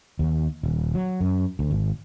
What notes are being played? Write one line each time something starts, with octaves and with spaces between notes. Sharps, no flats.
D#2
D#1
F#3
F#2
D2
G#1